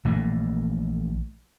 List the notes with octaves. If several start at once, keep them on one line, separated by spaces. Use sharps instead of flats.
A#1 E3 A3 A#3